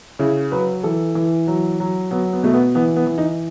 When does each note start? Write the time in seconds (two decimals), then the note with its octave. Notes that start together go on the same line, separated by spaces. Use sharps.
0.19 C#3 E4
0.51 F#3 B4
0.83 E3 A4
1.15 E3
1.47 F#3
1.80 F#3
2.11 F#3 B3
2.33 B3
2.43 B2 A3
2.54 B3
2.75 E3 B3
2.96 B3
3.07 E3
3.18 D#4